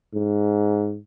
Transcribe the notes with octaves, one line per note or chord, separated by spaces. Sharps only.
G#2